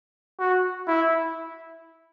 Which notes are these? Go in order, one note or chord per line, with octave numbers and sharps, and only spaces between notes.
F#4
E4